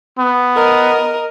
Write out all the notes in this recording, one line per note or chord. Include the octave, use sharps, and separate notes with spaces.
B3
A#4 D#5